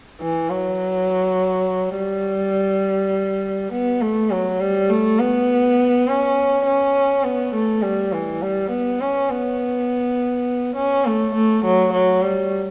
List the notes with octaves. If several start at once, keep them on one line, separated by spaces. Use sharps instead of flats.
E3
F#3
G3
B3
A3
F#3
G3
A3
B3
C#4
C#4
B3
A3
G3
E3
G3
B3
C#4
B3
C#4
A3
A3
F#3
F#3
G3